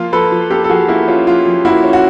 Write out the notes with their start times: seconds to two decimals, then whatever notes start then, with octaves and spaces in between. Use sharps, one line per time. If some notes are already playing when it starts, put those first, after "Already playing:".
Already playing: F3 A#3 F4
0.12 F3 A4 B4
0.32 F3
0.50 A#3 G4 A4
0.64 A4
0.69 F3 F#4 G#4
0.88 A#3 E4 F#4
1.08 C#4 F4
1.27 F3 F4
1.46 F3
1.65 A#3 E4 F#4
1.84 C#4
1.93 F#4